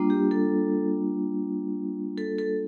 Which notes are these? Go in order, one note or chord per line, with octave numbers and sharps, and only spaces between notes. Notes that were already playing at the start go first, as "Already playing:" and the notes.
Already playing: G3 A#3 D4 F4
G4
A4
A4
A4